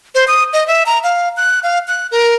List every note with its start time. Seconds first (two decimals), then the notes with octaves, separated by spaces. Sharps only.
0.15 C5
0.28 D#6
0.53 D#5
0.67 E5
0.86 A#5
1.04 F5
1.37 F#6
1.63 F5
1.88 F#6
2.11 A#4